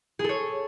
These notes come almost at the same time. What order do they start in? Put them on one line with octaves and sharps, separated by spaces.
G#4 A4 C#5